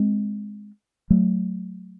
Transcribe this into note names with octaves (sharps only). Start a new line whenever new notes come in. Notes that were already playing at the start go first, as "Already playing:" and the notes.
Already playing: G#3 C4
F#3 A3